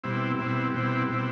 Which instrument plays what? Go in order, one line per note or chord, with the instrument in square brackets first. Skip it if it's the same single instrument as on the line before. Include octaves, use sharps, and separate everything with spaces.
[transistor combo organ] B2 G3 C4 E4
B2 G3 C4 E4
B2 G3 C4 E4
B2 G3 C4 E4